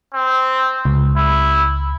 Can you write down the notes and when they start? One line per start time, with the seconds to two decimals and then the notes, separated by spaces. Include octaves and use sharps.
0.14 C4
0.85 C#2
1.17 E4